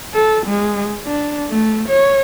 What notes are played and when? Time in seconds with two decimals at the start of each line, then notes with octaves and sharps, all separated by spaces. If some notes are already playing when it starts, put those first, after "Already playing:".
0.14 A4
0.46 G#3
1.06 D4
1.50 A3
1.89 C#5